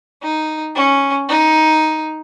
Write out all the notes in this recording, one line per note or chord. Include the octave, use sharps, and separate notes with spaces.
D#4
C#4
D#4